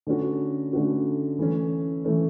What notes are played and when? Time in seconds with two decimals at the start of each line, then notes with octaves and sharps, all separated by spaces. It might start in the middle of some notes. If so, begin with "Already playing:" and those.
0.07 D3 A3 C#4 F#4
0.73 D3 A3 C#4 F#4
1.39 E3 A3 C#4
2.04 E3 A3 C#4